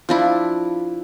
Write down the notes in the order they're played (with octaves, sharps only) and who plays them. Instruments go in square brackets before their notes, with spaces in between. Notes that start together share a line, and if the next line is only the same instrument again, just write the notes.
[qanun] F3 D4 E4